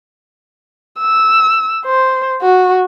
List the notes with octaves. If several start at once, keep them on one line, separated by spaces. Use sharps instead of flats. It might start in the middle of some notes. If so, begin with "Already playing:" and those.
E6
C5
F#4